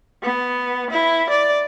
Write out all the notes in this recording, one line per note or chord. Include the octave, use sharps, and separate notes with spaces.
B3
E4
D5